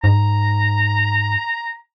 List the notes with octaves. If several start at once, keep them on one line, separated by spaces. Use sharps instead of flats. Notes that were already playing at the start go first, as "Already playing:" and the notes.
G#2 A#5